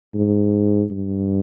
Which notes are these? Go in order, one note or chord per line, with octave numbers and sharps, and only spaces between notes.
G#2
G2